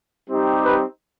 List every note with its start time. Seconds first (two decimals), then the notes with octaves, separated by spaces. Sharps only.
0.29 G3 C4 D#4 G4
0.63 B4